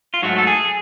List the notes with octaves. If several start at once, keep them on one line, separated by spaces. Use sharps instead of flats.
F4
G#2 F#3 A3 F#4
A4
G#4